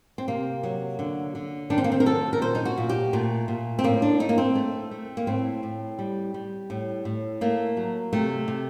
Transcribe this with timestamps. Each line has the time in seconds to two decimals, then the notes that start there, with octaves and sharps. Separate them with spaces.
0.18 C4
0.28 C3 A#3
0.63 F#3
0.99 D3
1.35 D3
1.70 D#3 D4
1.78 C4
1.84 A#3
1.92 C4
2.00 A#4
2.06 F#3 A4
2.33 A#4
2.42 A#2 C5
2.55 D#4
2.65 F#4
2.78 A#2
2.90 G4
3.13 A#2 A3
3.48 A#2
3.79 C4
3.84 A2 A#3
4.02 D4
4.20 A3 D#4
4.29 A#3
4.38 C4
4.55 A3
4.91 A3
5.17 A#3
5.27 A2 C4
5.63 A2
5.99 G3
6.34 G3
6.70 A2
7.05 A2
7.41 A3 A#3
7.77 F#3
8.13 C3 A3
8.48 C3